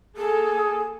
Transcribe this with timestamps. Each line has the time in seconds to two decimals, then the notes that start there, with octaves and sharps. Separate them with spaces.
0.17 A#3 G#4 A4